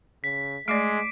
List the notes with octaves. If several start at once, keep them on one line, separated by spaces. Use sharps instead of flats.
C#3 B6
G#3 A3 D5 D6 C7 D7